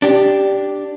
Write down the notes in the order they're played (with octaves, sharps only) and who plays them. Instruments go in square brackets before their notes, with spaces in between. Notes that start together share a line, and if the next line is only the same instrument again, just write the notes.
[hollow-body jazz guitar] D4 G4